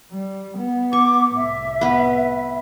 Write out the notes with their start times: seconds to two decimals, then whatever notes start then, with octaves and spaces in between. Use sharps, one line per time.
0.12 G3
0.57 B3
0.93 C#6 D6
1.36 C2 A2 E5
1.81 B3 B4